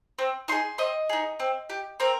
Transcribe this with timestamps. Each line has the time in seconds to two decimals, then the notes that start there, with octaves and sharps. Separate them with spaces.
0.19 C4
0.48 D#4 G#4 C6
0.78 C4 D#5
1.09 D#4 G#4
1.40 C4
1.70 G4
2.00 C4 A#4